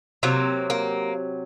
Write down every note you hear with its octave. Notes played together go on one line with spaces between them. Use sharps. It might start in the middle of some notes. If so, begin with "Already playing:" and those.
C3 F#3 A#3
A#3